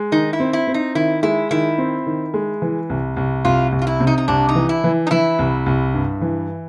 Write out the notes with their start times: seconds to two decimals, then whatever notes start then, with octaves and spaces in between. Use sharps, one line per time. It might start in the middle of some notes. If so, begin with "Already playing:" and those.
Already playing: G#3
0.12 D#3 D#4
0.33 E4
0.40 C4
0.53 E4
0.68 C4
0.74 D#4
0.95 D#3 E4
1.23 G#3 E4
1.51 D#3 E4
1.78 C4
2.06 D#3
2.34 G#3
2.62 E3
2.90 C2
3.17 C2
3.45 C2 F4
3.72 C2
3.82 F4
3.87 E4
4.00 C3
4.07 D#4
4.18 D#4
4.28 C2 D4
4.49 D#4
4.55 E3
4.69 E4
4.84 E3
5.07 D#4
5.11 E3 E4
5.39 C2
5.66 C2
5.94 G2
6.21 E3